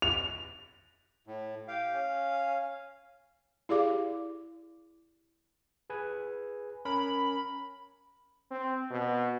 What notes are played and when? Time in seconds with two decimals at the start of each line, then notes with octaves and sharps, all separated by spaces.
0.02 F7
1.27 A2
1.68 G4 F5
1.94 C#4
3.69 E4 G4 G#4 D5 F5 D6
5.90 G#4 B4 G#5
6.85 C#4 A#4 B5
8.51 C4
8.91 B2